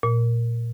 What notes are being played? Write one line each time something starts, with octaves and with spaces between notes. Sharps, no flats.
A#2